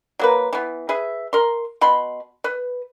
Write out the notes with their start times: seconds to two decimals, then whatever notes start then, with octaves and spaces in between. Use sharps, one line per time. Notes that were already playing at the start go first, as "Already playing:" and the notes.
0.19 F#3 A#3 B4
0.53 E3 B3
0.89 G#4 B4 E5
1.33 A#4 C6
1.81 B2 B5 C6
2.44 B4